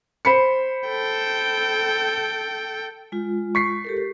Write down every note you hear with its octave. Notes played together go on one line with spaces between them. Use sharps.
C5 B5 C#7
A4 G5
G#3 F4
C#6 B6 C7
G4 A4 A#4